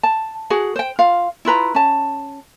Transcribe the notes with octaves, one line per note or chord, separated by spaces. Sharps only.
A5
F#4 G#4 F#5
C5 G5
F4 F5
E4 F4 B4 A#5
C#4 A5